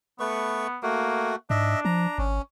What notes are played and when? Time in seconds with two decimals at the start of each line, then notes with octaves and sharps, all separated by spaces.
0.20 A3 B3 B4 C#6
0.83 A3 A#3 F#4
1.50 G#2 D4 D#5 E5
1.85 F3 A#5
2.18 G#1 C#4